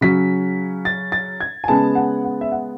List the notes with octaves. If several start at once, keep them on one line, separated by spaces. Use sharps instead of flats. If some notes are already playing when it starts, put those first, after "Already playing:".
C#3 F#3 C#4 B6
A6
A6
G#6
G#5
C#3 G#3 B3 A5
F#5
F#5
E5
F#5